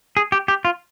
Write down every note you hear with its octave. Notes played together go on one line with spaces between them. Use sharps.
G#4
G4
G4
F4